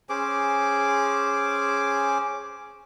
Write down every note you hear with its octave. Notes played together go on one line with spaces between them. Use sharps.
C#4 G#4 C5 D6